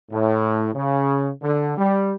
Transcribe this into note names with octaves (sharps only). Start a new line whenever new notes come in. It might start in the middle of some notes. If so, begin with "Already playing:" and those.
A2
C#3
D3
G3